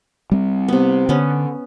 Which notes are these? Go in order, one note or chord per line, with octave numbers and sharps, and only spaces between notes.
G3 C4
C3 B3
D3 B3 C#4